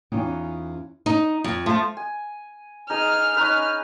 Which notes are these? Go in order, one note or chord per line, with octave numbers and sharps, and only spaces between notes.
E2 C#4 D#4 F4 G5
D#4
F2
F3 A3
G#5
D#4 G#4 D#6 F6
C#4 D#4 B4